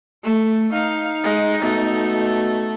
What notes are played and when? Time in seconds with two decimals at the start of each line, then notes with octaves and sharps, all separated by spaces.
0.23 A3
0.73 D#4 F5
1.24 G#3
1.63 B2 A3